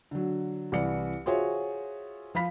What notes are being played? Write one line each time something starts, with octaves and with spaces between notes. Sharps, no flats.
D3 F#3
C2 E3 D5 C#7
F4 F#4 G#4 C5 C#5 E5
F3 F5 B5 B6